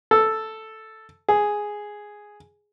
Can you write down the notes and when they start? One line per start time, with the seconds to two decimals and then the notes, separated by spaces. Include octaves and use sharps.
0.11 A4
1.29 G#4